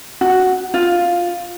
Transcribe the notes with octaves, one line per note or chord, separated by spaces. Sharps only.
F#4
F4